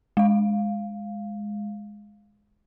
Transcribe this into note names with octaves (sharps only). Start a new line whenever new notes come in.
G#3 F5